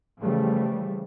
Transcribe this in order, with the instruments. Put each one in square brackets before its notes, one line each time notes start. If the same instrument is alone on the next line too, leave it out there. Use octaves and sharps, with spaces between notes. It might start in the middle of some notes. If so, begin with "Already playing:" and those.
[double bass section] C#3 E3 F3 G3 A3